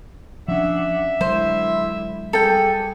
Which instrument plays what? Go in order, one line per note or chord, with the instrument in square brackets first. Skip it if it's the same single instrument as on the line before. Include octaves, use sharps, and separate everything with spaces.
[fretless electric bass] F3 C#4 [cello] D4 F#5 [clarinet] E5
[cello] D3 E4 [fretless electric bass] F#3 G#3 [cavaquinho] C5
[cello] G3 G#4 [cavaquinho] A4 G5